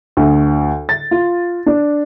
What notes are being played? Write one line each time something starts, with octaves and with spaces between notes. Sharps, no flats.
D2
A6
F4
D4